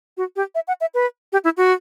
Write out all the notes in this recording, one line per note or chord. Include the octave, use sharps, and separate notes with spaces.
F#4
G4
E5
F#5
E5
B4
G4
E4
F#4